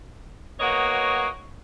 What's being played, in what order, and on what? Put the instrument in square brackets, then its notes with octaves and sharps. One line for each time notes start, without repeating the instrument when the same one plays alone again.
[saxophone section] A#3 B3 F#4 C#5 D#5